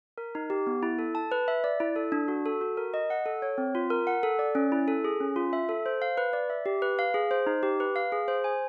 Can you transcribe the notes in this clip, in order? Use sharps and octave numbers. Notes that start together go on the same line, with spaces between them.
A#4
D#4
G4
B3
E4
A4
A5
B4
E5
D5
E4
A4
D4
F#4
A4
F#4
A#4
D#5
F#5
A4
C#5
C4
F4
A#4
F#5
A4
D5
C#4
E4
A4
G#4
C#4
F4
E5
A4
C5
F5
B4
D5
E5
G4
B4
F5
G#4
C5
D#4
G4
B4
F5
G#4
C5
G#5